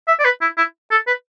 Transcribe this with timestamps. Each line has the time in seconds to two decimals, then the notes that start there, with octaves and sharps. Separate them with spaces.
0.08 E5
0.19 D5
0.25 B4
0.42 E4
0.58 E4
0.91 A4
1.07 B4